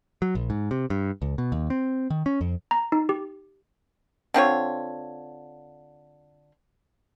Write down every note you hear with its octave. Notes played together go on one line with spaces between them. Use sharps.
F#3
A#1
G#2
C3
G2
C#2
B2
D#2
C4
D#3
C#4
F2
A#5
D#4
G4
D3 C4 F4 C#5